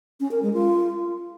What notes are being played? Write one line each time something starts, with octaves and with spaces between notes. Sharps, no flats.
C#4
A#4
G#3
F4